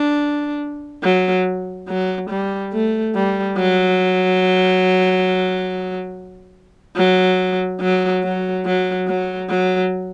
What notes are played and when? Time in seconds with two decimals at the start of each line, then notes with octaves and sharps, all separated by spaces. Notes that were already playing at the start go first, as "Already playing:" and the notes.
Already playing: D4
1.03 F#3
1.88 F#3
2.30 G3
2.73 A3
3.15 G3
3.57 F#3
6.97 F#3
7.81 F#3
8.23 F#3
8.65 F#3
9.08 F#3
9.50 F#3